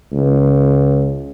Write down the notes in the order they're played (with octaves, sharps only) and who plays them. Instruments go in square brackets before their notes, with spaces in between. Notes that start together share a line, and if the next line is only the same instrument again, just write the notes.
[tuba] C#2